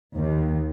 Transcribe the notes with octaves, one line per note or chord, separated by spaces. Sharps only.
D#2